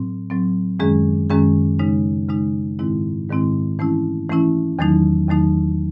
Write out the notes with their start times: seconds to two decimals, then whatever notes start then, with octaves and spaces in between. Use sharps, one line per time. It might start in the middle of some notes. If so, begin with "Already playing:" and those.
Already playing: A2 F#3 C4
0.30 A2 F#3 C4
0.80 F#2 D#3 G#3 C#4 G#4
1.30 F#2 D#3 G#3 C#4 G#4
1.79 C#3 G#3 D#4
2.29 C#3 G#3 D#4
2.79 G#2 D#3 G#3 C4 E4
3.29 G#2 D#3 G#3 C4 E4
3.79 E3 A3 C#4 E4
4.29 E3 A3 C#4 E4
4.79 E2 D#3 F#3 A3 D#4
5.29 E2 D#3 F#3 A3 D#4